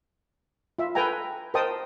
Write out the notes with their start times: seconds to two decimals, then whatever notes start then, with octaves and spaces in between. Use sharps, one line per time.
0.79 F4 E5
0.95 A4 B4 G5 G#5 A#5
1.54 A#4 C5 D#5 G5 A5 D#6